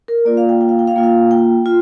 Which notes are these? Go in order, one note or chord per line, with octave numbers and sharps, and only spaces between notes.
A#4
A#3 F4 D5
F5
G5
G5
F5
G5
F5
A#3 F4 G5
F5
G5
F4